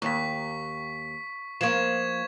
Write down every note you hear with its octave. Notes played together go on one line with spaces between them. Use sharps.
D#2 C#6 B6
F3 A#3 C#6 G#6 E7